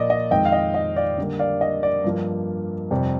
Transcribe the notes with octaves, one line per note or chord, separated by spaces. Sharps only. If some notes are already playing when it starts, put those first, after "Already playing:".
Already playing: A#2 F3 A#3 D5 D#5
D#5
F2 D#3 G#3 C4 D#5 G5
F5
D#5
D#5
D5 F5
D3 G3 A#3
D5 F5
D#5
D5
G2 F3 A#3
F2 C3 G3